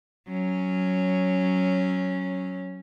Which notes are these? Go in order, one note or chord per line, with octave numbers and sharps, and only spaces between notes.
F#3 C#4